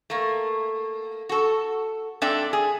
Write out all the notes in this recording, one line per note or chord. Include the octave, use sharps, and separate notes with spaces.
A3 A#3
F#4 A4
G#2 C4 D4 A4 E5 G5
G#4